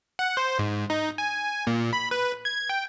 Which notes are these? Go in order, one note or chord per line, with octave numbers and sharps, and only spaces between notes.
F#5
C5
G#2
D#4
G#5
A#2
B5
B4
G#6
G5